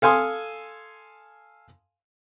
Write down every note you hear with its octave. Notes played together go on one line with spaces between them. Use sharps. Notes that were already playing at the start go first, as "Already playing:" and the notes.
A4 F5 G#5 C6 D#6